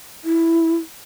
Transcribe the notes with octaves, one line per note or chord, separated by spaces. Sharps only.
E4